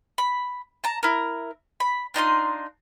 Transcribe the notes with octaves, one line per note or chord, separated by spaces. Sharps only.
B5
A5 A#5
E4 A#4
B5
D4 D#4 F4 C6